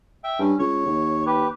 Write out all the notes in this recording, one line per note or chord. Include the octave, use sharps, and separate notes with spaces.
E5 G5
G2 C#4
C#2 C#5
D#2
G4 B4